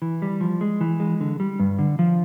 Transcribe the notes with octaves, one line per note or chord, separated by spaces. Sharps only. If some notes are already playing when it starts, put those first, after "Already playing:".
E3
G3
F3
G#3
E3
G#3
D3
G3
G2
D3
F3